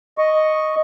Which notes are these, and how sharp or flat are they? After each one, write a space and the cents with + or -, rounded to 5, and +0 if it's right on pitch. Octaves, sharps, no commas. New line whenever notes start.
D#5 +0 C#6 +0